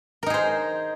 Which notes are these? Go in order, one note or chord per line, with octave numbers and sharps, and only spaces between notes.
D#4 G#4 A#4 C5